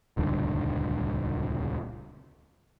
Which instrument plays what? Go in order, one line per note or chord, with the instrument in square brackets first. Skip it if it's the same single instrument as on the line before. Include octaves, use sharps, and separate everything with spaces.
[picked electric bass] D#1 C#2 G2 D3